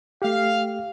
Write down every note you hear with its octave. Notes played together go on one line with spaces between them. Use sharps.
A3 G4 F5